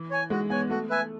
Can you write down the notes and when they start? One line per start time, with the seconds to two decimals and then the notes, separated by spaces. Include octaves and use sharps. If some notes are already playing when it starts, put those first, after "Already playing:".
Already playing: E3
0.11 C#5 G#5
0.30 G#3 F#4
0.50 B3 C#5 G#5
0.69 A3 F#4
0.89 B4 E5 G#5